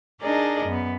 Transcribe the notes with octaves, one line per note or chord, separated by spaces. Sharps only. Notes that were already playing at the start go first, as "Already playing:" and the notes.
D4 D#4 G#4 A#4 D5 D#5
F#2 B3